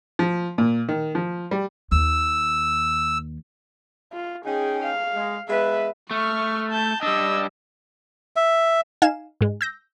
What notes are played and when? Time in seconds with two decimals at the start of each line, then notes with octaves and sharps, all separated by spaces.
0.19 F3
0.58 A#2
0.89 D#3
1.15 F3
1.51 G3
1.92 D#2 E6
4.12 F4
4.45 C#4 D#4 G#4 G5
4.83 F5
5.14 G#3
5.49 G#3 B3 B4 E5
6.11 A3 C#6 F6
6.71 A5 G6
7.03 G3 D4 D#5 E6
8.36 E5
9.02 D#4 F5 G#5 E7
9.41 G#2 G#3
9.61 E6 G6 A#6